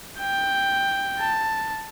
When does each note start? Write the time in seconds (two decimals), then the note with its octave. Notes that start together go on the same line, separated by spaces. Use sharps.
0.19 G5
1.19 A5